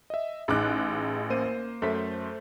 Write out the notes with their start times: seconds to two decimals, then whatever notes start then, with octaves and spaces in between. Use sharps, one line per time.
0.10 D#5 E5
0.48 A1 D#4 G#4 D6 F#6
1.30 A#3 C5 D#7
1.82 F#2 A3 C5 B6